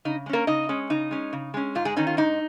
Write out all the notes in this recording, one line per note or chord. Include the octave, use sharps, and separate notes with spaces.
C#3 D#4
G#3
A#3 C#4 A#4
C#3 D#4 D#5
G#3 C#4
C#3 D#4
G#3 C#4
C#3
G#3 C#4
G#2 F4
G#3 G#4
D#3 C#4 D#4
F4
G#2 D#4